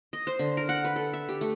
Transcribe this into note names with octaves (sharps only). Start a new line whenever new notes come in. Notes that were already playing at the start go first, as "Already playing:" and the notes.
D#5
C5
D3
A#4
F#5
B4
A4
E5
G4
A3